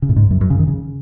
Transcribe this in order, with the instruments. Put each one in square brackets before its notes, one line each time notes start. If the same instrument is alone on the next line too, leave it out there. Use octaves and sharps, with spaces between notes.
[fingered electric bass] C#3
A2
G#2
F#2
F#2
C#3
D#3
C#3